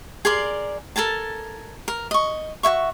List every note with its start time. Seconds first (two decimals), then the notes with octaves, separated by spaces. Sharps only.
0.25 G#4 A#4 D5 C6
0.96 A4 A#4 G#5 A5
1.88 A#4
2.11 D#5 C#6
2.63 F#4 C#5 E5 C#6